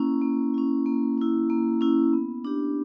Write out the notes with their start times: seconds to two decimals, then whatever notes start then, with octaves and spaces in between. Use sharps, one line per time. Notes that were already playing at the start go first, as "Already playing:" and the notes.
Already playing: A#3 C#4 E4
0.21 A#3
0.54 C#4 E4
0.86 A#3
1.17 C#4 E4
1.50 A#3
1.81 C#4 E4
2.13 B3
2.45 D4 G4